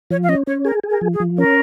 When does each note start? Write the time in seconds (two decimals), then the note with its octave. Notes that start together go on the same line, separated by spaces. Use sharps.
0.11 F3 C#5
0.23 F5
0.29 C#4 D#5
0.47 C#4 C#5
0.65 G#4 A#4
0.84 G#4
0.90 A#4
1.01 F3
1.14 G#4
1.20 F3
1.38 C#4 A#4